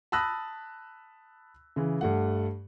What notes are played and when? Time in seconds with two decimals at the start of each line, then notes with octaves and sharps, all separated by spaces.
0.12 A5 B5 D#6 E6 F#6 A#6
1.76 C#3 E3
2.01 G2 A3 F#5